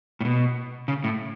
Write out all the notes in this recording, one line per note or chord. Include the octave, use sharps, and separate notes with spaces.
A2
B2
C#3
A2